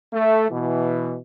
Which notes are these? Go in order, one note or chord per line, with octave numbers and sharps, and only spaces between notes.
A3
B2 E3